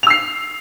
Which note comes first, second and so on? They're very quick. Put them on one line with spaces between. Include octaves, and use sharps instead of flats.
F7 E6 C7